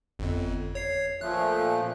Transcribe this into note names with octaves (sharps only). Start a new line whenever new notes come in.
G1 F2
C#5 C7
A#2 F3 A3 F#6